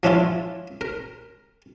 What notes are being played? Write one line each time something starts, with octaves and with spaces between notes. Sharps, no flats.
F3 C#4 D4 E4 F4
A#4